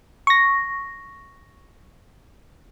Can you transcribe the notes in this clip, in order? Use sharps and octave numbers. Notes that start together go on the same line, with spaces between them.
C#6 A#6